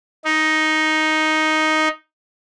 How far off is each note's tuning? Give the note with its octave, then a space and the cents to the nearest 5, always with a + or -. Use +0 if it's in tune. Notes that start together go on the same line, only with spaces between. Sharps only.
D#4 +5